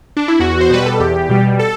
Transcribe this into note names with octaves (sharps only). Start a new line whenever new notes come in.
D4
E4
E2 F#4
C5
B2 G3 B4
A4
E2 G4
B2 G3
A4